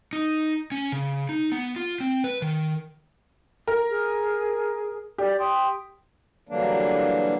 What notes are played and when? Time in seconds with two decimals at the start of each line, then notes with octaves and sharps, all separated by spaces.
0.13 D#4
0.72 C#4
0.92 C#3
1.29 D#4
1.52 B3
1.76 F4
2.00 C4
2.24 B4
2.42 D#3
3.67 A#4
3.88 G#4
5.18 G4 D5
5.39 G5 C6 D#6
6.49 D3 E3 F#3 G3 A#3 D4